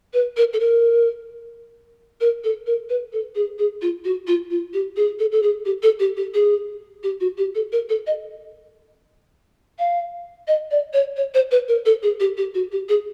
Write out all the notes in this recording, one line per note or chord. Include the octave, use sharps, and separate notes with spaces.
B4
A#4
A4
A#4
A#4
A4
A#4
B4
A4
G#4
G#4
F4
F#4
F4
F4
G4
G#4
A4
A4
G#4
G4
A4
G4
G4
G#4
G4
F#4
G4
A4
A#4
A4
D#5
F5
D#5
D5
C#5
C#5
C5
B4
A#4
A4
G#4
G4
G4
F#4
G4
G#4